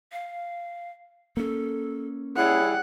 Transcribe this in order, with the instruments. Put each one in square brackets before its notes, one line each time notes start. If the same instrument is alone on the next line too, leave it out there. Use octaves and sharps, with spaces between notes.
[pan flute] F5
[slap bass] A#3 C#4 [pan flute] A4
[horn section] G3 E4 G#4 [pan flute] C#5 [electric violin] F#5